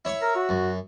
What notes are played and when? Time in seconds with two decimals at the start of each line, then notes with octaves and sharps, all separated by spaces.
0.05 E4 C#5 C#6
0.22 A#4
0.36 F#4
0.49 F#2